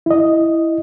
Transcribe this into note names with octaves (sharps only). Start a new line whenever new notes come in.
E4 D#5